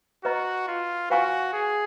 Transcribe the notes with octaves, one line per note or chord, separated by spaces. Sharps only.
F#4 B4 D#5 A#5 C#6
F4
F#4 B4 F5 G#5 C#6
G#4